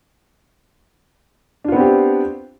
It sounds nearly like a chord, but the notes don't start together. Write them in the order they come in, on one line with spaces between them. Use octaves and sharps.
D4 F4 B3 C4 G4